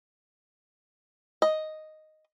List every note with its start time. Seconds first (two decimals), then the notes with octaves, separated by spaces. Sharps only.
1.42 D#5